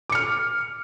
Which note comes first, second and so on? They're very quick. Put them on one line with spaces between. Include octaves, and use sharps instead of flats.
D6 C#7 F6